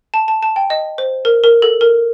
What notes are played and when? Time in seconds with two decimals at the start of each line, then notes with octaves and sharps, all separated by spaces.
0.14 A5
0.28 A5
0.42 A5
0.56 G5
0.70 D#5
0.98 C5
1.25 A#4
1.44 A#4
1.62 A4
1.81 A#4